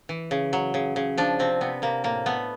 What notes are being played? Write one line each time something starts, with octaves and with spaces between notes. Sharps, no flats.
E3
C#3
F#3
C#3
C#3
F3 D4
C3 C4
C3 B3
C3 A#3
A2 A#3
A3 B3